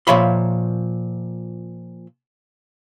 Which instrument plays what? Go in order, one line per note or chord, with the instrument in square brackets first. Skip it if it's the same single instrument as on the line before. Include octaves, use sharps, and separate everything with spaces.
[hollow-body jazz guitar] A#2 F3 C#5 E5 B5 C6